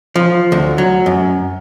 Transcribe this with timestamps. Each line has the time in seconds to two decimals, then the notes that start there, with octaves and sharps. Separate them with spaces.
0.16 F3
0.52 D2
0.78 F#3
1.06 F#2